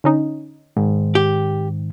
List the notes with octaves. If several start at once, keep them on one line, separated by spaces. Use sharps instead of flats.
D3 C#4 D#4
G#2 D#3
G4